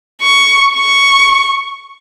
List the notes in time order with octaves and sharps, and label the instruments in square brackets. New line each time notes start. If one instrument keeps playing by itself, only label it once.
[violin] C#6
C#6